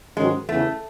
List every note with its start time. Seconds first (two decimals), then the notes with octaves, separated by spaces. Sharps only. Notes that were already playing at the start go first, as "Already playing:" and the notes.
0.17 G#2 D#3 F#3 G#3 C#4 F#4
0.48 E2 C#3 E3 A3